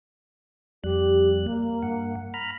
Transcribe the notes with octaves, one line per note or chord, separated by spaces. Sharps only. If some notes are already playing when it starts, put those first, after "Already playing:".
F2 G3 G4 F#6
A#3
G2 F#5
A#5 B5 F6